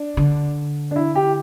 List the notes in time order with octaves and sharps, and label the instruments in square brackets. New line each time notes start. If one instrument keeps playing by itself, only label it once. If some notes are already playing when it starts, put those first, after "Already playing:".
Already playing: [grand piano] D4
[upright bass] D3
[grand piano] D4
E4
G4